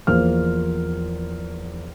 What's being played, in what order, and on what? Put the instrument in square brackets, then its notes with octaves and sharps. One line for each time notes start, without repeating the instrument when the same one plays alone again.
[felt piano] E2 F3 A#3 C5 F6